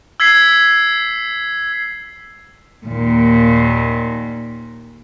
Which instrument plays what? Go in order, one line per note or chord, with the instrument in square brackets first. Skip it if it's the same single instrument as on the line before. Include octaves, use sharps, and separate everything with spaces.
[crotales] E6 G#6 B6 C7
[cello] D#2 A#2